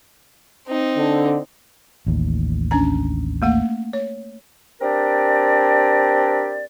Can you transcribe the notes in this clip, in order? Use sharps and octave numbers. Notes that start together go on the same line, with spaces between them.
C4 D#4
D3
A1 D#2
C#4 D4 A#5
A3 A#3 F#5
C#5
C4 D4 G4 A#4 D5